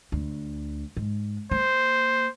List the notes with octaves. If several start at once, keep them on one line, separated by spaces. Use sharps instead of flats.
D2
G#2
A#3 C5